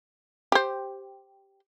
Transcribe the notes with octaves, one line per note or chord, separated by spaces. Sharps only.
G4 C5